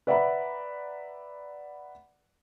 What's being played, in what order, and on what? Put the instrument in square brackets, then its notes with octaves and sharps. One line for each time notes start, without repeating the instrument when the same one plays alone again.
[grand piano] B4 D5 E5 F#5 A#5 B5